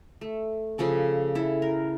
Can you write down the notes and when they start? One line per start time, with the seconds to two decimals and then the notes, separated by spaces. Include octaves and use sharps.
0.21 A3
0.78 C#3 F3 A4 D5
1.35 E4 A4
1.62 A#4